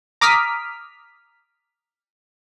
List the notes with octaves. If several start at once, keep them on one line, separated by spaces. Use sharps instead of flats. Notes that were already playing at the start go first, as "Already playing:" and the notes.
A#5 D6 D#6 F6 B6